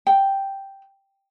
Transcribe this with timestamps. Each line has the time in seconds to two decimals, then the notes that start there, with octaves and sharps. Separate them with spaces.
0.07 G5